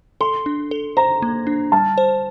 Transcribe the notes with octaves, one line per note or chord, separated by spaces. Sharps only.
A4 C6
D4
A4
C5 A#5
A#3
D4
G3 A5
C5